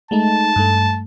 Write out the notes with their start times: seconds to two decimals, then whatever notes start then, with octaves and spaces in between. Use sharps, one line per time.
0.11 G#3 A3 D#4 A5
0.56 G2 A3